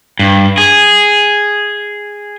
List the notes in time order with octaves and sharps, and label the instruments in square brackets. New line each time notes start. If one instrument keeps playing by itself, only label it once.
[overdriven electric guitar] G2
G#4